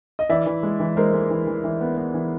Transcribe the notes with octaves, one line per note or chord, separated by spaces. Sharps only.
D#5
E3 D5 E5
E3
G#3
E3
G#3 A#4 C5
G#3
E3
E3
E3
B3
B3
E3